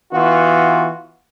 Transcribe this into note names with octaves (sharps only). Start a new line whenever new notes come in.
E3 B3 F4 F#4